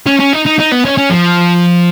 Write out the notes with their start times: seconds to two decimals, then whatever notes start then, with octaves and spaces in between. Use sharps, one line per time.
0.06 C#4
0.19 C#4
0.33 D#4
0.45 D#4
0.59 D#4
0.71 B3
0.85 C#4
0.98 C#4
1.10 F3